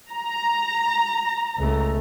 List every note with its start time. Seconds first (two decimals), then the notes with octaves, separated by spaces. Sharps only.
0.12 A#5
1.58 C#2 A3